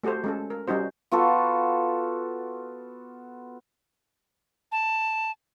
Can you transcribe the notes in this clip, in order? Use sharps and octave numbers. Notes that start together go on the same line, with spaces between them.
A3 F#4 G4 A4 C5
G#3 C#4 A4
A#4
G3 C#4 D#4 F#4 C5
B3 F4 F#4 A4
A5